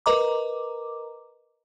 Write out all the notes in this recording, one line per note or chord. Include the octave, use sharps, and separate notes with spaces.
A#4 B4 D#5 A#5 D6